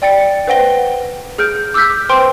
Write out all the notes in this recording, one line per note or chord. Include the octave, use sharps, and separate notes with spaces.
D5 G5 A6 C#7
B4 C5 F#5 G5 A#6 G7
G#4 F6 G6 D7
D6 E6 F6 G6 B6
B4 C5 G5 C6 D7